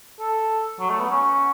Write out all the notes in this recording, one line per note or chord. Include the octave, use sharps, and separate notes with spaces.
A4
F#3
A3
B3
C#4